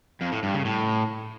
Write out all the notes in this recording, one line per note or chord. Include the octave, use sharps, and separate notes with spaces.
F2
A2
G2
C#3
A2